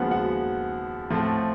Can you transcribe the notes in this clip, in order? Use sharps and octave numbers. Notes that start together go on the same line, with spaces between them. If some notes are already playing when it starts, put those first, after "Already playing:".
Already playing: D#2 C#3 F3 G#3 B3 F#4 F#5
F#4 F#5
A2 F3 A3 C4